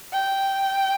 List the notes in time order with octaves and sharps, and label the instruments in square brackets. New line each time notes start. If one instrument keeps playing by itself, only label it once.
[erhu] G5